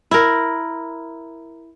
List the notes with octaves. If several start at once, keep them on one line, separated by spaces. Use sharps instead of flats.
E4 A#4